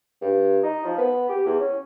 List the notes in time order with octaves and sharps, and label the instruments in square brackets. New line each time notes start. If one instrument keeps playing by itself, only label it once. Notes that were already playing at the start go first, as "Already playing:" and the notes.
[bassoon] G2
D#4
F3
B3
G4
E2
C#4